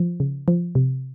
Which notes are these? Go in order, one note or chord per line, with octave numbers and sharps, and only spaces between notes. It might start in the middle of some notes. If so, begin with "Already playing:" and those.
Already playing: F3
C#3
F3
C3